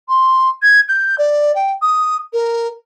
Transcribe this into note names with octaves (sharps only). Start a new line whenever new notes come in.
C6
G#6
G6
D5
G5
D#6
A#4